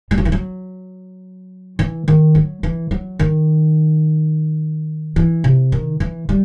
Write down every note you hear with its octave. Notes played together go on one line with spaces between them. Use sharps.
G3
F#3
E3
F#3
E3
D#3
F#3
E3
F#3
D#3
E3
C3
D#3
E3
G3